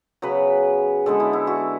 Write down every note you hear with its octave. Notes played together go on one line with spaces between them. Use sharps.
C#3 F#3 B3 B4
D3 G#3 B3 A4
E4
E4
F#4